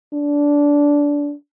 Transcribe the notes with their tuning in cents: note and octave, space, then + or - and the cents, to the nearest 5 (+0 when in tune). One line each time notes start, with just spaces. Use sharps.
D4 -15